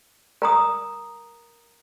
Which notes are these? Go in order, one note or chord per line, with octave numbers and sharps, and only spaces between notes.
A#4 A#5 D#6